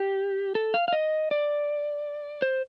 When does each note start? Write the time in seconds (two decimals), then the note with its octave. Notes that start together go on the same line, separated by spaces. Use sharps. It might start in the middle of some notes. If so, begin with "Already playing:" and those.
Already playing: G4
0.55 A4
0.74 F5
0.88 F5
0.93 D#5
1.31 D5
2.42 C5